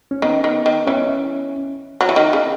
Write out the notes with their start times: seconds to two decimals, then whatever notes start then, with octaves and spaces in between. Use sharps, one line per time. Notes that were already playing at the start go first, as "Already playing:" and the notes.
0.11 C#4
0.22 D#3 B3
0.44 D#3
0.66 D#3
0.87 E3 C#4
2.01 F#3
2.09 E3
2.16 D#3
2.33 C#3